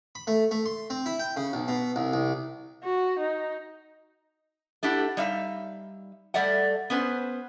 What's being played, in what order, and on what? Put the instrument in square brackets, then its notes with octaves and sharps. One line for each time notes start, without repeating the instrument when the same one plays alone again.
[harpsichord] B5
A3
A3
C6
C4
E4
G5
C#3
B1
B2
C2
C2
[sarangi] F#4
D#4
[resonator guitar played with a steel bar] A3 D4 E4 G4 F#5
G3 D#4 E5 F5
G3 A3 D5 E5 F#5
B3 C#4 B4 C5